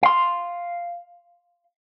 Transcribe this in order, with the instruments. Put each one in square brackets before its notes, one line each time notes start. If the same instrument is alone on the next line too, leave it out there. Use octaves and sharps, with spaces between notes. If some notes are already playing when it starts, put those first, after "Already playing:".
[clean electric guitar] F5 C6